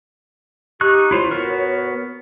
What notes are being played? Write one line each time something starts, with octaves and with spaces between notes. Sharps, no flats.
D#4 G4 C#6 F#6
E4 F4 C5 C#5
B3 F#4 A#4